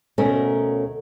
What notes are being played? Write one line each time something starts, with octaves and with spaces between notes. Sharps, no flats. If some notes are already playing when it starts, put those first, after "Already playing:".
D2 B2 A3 C#4 A#4